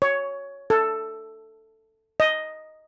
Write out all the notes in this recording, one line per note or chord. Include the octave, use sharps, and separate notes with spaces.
C#5
A4
D#5